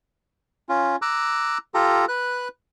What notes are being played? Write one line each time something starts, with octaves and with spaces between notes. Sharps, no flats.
C#4 F4
A#5 D6 E6 F#6
F4 G4 A4 A#5
B4 F#6